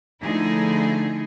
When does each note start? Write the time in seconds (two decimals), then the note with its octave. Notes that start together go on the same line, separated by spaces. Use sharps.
0.22 D3 F3 A3 D#4 E4 G#4